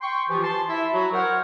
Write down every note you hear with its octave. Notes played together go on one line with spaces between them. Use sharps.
G5 C6 C#6
E3 F3 F4 G4
A5 C6
E4 E5
F#3 F#4
A#4 C5 C#5 F#5